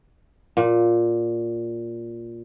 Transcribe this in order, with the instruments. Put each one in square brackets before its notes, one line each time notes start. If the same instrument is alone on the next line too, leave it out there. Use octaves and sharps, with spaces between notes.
[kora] A#2